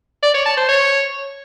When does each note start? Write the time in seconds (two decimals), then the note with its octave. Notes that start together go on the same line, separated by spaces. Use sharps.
0.23 D5
0.34 C#5
0.46 A5
0.57 C5
0.69 C#5